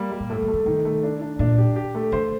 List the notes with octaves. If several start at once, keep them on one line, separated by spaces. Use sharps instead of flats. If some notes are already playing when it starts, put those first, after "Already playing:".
Already playing: G3 A#3
G3
A#2
A2 A3
D#3
A3
D3
C3 D#3
A3
D4
D4
A#2 D4
G4
G4
A3
D3 C5